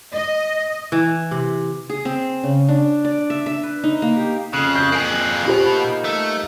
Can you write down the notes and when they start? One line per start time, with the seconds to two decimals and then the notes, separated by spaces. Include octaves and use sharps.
0.13 D#5
0.92 E3
1.31 C3
1.90 G#4
2.05 C4
2.43 C#3
2.69 D4
3.05 D5
3.30 E5
3.46 E5
3.63 B4
3.84 D#4
4.02 A#3
4.17 G4
4.53 F2 C#3 F#6
4.76 G6
4.92 A#3 G#4
5.46 B2 F4 G4 C5 B5
5.71 A#3 D#4
6.04 A3